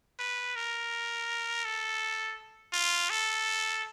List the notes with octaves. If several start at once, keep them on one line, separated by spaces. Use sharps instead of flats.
B4
A#4
A4
F4
A4